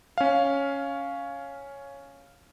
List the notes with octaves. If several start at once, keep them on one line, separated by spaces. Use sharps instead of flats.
C#4 F5